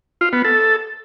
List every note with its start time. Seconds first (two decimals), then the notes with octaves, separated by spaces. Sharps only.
0.21 F4
0.33 B3
0.45 A4